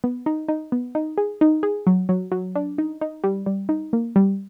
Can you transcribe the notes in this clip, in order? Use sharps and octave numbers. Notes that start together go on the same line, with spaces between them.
B3
D#4
D#4
B3
D#4
G#4
D#4
G#4
F#3
F#3
F#3
D4
D#4
D#4
G3
G3
D#4
A#3
G3